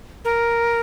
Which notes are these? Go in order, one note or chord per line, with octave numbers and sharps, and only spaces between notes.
A#4